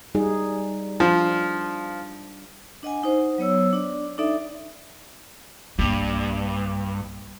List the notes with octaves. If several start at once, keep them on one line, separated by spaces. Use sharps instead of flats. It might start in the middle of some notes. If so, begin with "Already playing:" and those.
G3 D#4 G#4
F3 D4
D4 D#5 F#5 G#5
D#4 C5 F#5
F#3 B3 C#5 E6
D4 D5
D4 D#4 A4 D5 E5
B1 G2 A#3